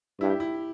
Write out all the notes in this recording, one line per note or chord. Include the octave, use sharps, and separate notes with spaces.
G2 E4
G4
E4